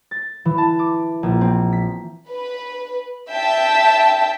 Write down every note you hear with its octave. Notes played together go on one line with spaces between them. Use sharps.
A6
E3
A5
D6
A#1
C4
B6
B4
E5 G5 A5